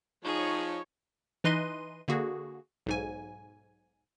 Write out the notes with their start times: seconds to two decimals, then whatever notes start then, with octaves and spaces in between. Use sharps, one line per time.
0.25 F3 D#4 G#4 C#5
1.44 E3 D#4 B4 D#5 C6 D#7
2.08 D3 A#3 F#4 G#4
2.86 B1 G#2 G#5